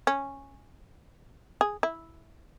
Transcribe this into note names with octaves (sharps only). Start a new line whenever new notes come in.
C#4
G#4
E4